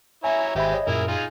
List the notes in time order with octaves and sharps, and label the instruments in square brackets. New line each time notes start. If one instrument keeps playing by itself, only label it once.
[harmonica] E4 C#5 A#5 [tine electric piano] E5 G#5
[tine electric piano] G#1 E5 B5 [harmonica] G#3 C4 G4
[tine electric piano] C#5 D#5
[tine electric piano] F#2 A#2 [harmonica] E4 G#4 A#4
[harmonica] D#4 F4 G#4